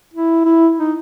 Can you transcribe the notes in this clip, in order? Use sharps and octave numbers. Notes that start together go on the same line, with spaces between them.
E4
E4
D#4